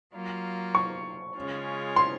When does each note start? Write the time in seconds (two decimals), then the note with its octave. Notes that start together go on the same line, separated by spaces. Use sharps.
0.13 F#3 A#3 F4
0.75 C#6
1.35 C#3 G#3 C#4 F4
1.96 C6